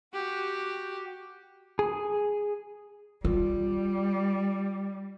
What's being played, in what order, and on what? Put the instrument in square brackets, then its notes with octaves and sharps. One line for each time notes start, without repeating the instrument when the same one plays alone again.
[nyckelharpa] F#4 G4
[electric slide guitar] G#4
[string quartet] G3 [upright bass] F4